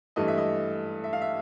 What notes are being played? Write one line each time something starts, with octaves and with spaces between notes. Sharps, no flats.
G2 E3 A3 D#5
E5
D#5
E5
F5
E5